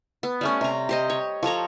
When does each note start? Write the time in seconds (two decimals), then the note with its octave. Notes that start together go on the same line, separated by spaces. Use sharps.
0.23 B3
0.41 G3 A3 C#4
0.61 C3 A#5
0.89 G4 C5 D#5
1.10 C#5
1.43 F3 A4 C#5 A#5